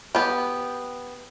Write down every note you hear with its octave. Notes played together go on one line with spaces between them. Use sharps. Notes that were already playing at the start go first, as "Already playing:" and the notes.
B3 G4